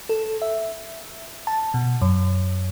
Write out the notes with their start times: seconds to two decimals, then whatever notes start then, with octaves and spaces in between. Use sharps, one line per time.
0.09 A4
0.42 E5
1.47 A5
1.74 B2
2.01 F#2